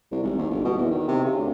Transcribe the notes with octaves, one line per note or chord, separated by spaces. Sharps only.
C2
G#1
D#2
G1
B2
E2
D#3
C3
C#3
D2